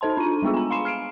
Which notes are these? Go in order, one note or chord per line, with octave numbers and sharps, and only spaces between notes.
D#4 A4 C5 A5 C6
D4 F4 D#7
G3 G#3 B3 F4 G#4
G#5 A#5
F5 B5 C6 C7 E7
F6 C7 D7